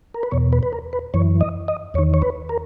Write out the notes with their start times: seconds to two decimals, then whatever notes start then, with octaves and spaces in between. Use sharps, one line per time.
0.14 A#4
0.23 B4
0.31 E2 B2 C#5
0.53 B4
0.63 B4
0.73 A#4
0.93 B4
1.14 F#2 E3 C#5
1.41 D#5
1.68 D#5
1.94 E2 C#5
1.98 D#3
2.14 C#5
2.22 B4
2.49 A#4